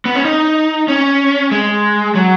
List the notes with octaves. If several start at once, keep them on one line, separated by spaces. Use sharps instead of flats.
B3
C#4
D#4
C#4
G#3
F#3